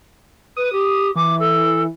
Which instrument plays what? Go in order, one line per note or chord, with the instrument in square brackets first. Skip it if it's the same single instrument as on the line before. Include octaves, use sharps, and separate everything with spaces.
[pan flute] B4 [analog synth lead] D#6
[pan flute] G4
[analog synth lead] E3 [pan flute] D6
[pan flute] A4